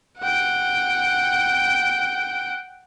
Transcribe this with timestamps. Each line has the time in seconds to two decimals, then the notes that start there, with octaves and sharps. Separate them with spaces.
0.19 F#5 G5